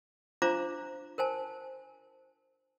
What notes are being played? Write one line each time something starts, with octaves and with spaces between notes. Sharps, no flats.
D4 F4 C5 F5 A#5 D6
A#4 C5 G#5 A5